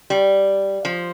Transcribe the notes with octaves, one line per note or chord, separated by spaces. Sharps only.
G3
F3